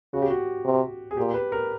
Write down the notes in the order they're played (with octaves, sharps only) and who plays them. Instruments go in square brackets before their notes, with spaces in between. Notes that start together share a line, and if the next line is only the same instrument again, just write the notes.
[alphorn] C#3 [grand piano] F#4
[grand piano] G4
F#4
[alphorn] C3
[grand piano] G#4
[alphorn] A#2 [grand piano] G4
[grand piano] B4
A#4